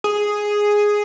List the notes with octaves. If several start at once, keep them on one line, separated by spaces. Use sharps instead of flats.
G#4